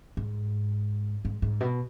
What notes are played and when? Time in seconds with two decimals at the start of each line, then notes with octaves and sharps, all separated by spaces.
0.17 G#2
1.25 G#2
1.42 G#2
1.61 B2